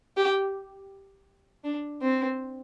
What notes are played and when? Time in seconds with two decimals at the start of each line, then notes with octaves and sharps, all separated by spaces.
0.17 G4
1.64 D4
2.01 C4